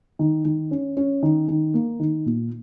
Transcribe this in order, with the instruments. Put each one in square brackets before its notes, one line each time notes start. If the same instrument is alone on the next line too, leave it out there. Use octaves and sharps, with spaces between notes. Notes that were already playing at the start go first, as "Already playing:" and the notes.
[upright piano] D#3
D#3
C#4
C#4
D#3
D#3
A#3
D#3
A#2